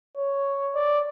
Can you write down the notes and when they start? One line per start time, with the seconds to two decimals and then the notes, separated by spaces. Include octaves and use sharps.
0.17 C#5
0.75 D5